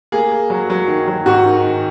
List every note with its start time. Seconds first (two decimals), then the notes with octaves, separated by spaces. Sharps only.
0.12 A#3 G#4
0.32 A#3
0.50 F#3
0.70 F#3
0.88 D#3
1.08 F#3
1.26 G#2 F#4
1.46 D#3
1.64 D#3